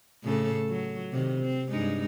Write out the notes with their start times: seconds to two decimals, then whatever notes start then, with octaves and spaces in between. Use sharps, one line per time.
0.23 A2 C#3 A4
0.70 F#3
1.12 C3 D#3
1.41 C4
1.71 G2 G#3 D#4